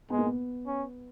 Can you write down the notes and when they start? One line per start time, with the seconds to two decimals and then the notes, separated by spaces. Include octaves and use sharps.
0.10 G#3 B3
0.18 A#3
0.26 B3
0.67 C#4